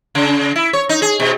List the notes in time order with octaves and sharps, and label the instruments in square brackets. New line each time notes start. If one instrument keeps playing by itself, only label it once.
[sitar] C#3
E4
C#5
D#4
G#4
B2